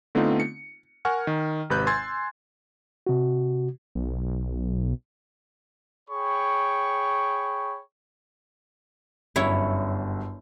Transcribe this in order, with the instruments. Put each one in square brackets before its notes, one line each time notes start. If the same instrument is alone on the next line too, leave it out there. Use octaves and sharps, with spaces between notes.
[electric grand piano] D3 A3 B3 C4 D#4 F4
C#7
A#4 F#5 G#5 C#6 F6
D#3
G#1 C3 B4 B5 F#6 G6
G#5 C6 E6 G#6 A6
[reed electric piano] C3 F#4
[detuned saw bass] B1
[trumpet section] G#4 C#5 G5 B5 C#6
[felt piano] G1 F#2 [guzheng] E4 C#5